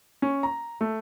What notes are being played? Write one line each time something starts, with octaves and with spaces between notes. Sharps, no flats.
C#4
A#5
A3